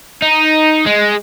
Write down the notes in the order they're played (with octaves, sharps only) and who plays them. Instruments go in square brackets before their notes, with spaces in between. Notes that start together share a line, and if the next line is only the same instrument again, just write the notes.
[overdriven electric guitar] D#4
G#3